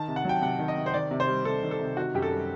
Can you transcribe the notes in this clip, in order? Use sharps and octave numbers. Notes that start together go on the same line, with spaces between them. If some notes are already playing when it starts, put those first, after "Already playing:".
Already playing: D#3 A5
C3
F#5
F#3 G5
C3 F#5
D#3
D#5
C3
C5
D#3 D5
C3
C5
G3
C3 A4
D#3
A4
C3
D#3 F#4
F#2 G4
A4
G3